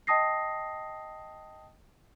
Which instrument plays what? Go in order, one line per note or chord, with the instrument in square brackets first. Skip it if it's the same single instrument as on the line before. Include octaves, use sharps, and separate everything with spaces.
[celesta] D#5 G5 A5 D#6 A#6 C7